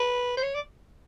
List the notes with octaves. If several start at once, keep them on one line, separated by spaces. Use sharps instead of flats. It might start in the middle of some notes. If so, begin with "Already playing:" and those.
Already playing: B4
C5
C#5
D5